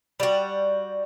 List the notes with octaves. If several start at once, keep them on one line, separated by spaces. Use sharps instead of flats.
G3 F#4